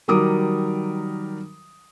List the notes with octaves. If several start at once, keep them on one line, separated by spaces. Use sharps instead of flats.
D#3 F#3 G3 A#4 D6 D#6